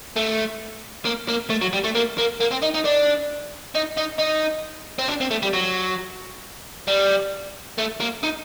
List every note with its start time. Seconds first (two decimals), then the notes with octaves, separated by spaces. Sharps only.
0.17 A3
1.05 A#3
1.28 A#3
1.50 A3
1.61 F#3
1.73 G3
1.84 A3
1.95 A#3
2.18 A#3
2.40 A#3
2.51 C4
2.62 D#4
2.74 D#4
2.85 D4
3.75 D#4
3.98 D#4
4.19 D#4
4.99 C4
5.08 D4
5.21 C4
5.31 A3
5.43 G3
5.53 F#3
6.88 G3
7.78 A3
8.00 A#3
8.23 D#4